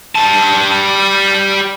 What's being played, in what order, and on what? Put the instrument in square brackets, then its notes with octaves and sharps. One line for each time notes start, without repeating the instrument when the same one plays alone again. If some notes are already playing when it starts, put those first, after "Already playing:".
[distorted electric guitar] G3 A5